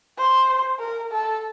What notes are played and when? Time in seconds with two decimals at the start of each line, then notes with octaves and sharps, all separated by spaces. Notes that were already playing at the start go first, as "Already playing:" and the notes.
0.17 C5
0.80 A#4
1.12 A4